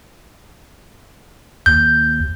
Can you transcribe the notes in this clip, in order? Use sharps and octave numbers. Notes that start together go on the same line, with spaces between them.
D#2 G6